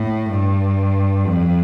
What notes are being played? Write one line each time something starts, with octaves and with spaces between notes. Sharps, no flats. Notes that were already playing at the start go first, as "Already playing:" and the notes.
Already playing: A2
G2
F2